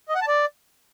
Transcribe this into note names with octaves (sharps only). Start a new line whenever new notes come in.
D#5
F#5
A5
D5